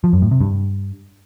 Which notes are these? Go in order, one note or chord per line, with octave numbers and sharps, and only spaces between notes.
F3
F#2
A2
C3
G2